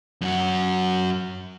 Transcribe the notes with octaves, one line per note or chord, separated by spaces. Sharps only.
F#2 F#4